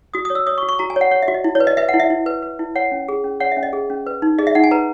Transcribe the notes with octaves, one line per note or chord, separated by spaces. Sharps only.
F#4 D#6
D#6
C#5
E6
C#5 D#6
C#6
F#4
C#6
F#4 A#5
G#5
C#5
F#5
C#5 F#5
E5
F#4
D#5
E4
C#5
B4
D#5
B4 E5
F#5
E4
E5
E4
B4
B4
E4
C#5 F#5
C#4
G#4
C#4
C#5 F#5
E5
C#4
D#5
G#4
C#4
B4
D#4
G#4 D#5
E5
D#4 F#5
G#5
B4 A#5